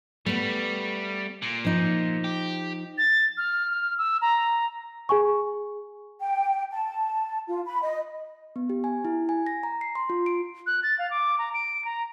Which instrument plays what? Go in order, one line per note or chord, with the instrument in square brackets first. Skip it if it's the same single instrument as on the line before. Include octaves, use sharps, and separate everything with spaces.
[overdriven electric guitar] G3 [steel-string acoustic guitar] A3 B3
[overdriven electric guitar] A#2
[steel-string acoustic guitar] F3 D#4
[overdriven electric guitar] G4
[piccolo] A6
F6
F6
E6
A#5
[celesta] G#4 G#5 C#6
[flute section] G5
A5
F4
B5
D#5
[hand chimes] B3
G4
G#5
E4
G#5
A#6
A#5
C7
C6
F4
D7
[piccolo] F#6
A6
F5
D6
A#5
D7
A#5